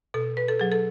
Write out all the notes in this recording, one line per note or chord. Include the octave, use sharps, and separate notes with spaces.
B2 A4
B4
A4
F#3 G#4
A4